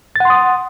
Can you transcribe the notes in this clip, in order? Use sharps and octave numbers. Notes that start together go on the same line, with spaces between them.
F#5 C6 D#6 A6